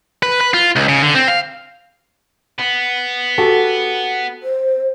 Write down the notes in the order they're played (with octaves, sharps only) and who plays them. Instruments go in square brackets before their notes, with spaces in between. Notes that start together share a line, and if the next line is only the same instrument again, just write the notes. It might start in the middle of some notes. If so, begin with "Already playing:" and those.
[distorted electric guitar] B4
B4
F4
C#2
C#3
D3
C4
F5
B3
[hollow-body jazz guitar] F#4 G4 A4
[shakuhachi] C5